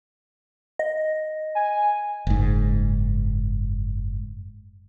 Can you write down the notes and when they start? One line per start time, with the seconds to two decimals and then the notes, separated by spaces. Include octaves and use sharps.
0.79 D#5
1.55 G#5
2.27 F#1 G#2